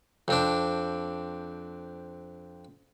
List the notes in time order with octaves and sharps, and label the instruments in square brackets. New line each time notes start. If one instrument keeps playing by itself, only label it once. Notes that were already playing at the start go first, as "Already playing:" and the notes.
[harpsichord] F2 C4 D4